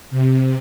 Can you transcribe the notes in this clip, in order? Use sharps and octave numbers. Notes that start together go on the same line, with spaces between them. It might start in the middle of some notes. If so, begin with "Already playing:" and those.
C3